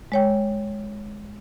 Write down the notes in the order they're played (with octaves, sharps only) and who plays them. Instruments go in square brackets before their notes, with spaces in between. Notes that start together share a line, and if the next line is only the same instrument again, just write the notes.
[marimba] G#3 C#5 G5